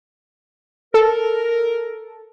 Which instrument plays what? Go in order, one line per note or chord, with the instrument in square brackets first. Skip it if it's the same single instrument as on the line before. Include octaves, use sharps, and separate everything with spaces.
[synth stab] A4 [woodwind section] A#4